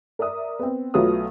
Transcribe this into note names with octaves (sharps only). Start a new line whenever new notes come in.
A#4 D5 E5 D#6
B3 C4
B1 F#3 A3 F4 B4 D#6